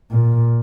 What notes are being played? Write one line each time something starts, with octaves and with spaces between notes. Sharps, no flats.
A#2